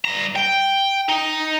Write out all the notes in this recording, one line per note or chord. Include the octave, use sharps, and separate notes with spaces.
G2 A#5
G5
D#4